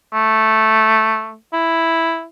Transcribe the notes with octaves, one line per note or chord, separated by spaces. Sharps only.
A3
E4